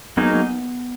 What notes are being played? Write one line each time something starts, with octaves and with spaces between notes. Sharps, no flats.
F#3 A#3 B3 D#4 G#4
B3